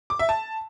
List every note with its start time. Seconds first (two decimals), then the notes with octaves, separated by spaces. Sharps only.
0.10 D6
0.19 E5
0.29 A5